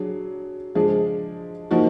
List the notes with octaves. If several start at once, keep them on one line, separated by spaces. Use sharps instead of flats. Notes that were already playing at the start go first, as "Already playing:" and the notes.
Already playing: F#3 D4 G#4
F3 G#3 D4 G#4
F3 A#3 D#4 F#4